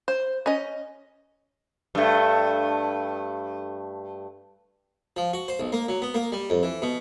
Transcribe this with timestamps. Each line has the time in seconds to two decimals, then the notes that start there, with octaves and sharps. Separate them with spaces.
0.08 C5
0.46 C#4 D#5
1.95 G2 A3
5.16 F3
5.33 F#4
5.48 C5
5.60 B1
5.72 A#3
5.88 F#3
6.02 B3
6.14 A#3
6.32 G3
6.50 F2
6.63 E3
6.82 B2